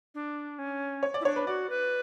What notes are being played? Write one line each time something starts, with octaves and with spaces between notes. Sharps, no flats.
D4
C#4
C#5
D5
E4
D4 C#5
B4
F#4 D5
B4